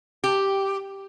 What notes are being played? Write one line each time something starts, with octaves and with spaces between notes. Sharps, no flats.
G4